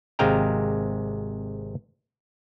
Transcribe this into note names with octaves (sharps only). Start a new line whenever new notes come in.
G#1 C3 G#3 F5 G5 A#5